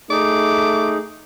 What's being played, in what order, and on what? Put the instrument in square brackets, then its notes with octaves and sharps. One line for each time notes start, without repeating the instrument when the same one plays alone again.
[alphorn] A3 [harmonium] D#4 G#4 [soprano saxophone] D6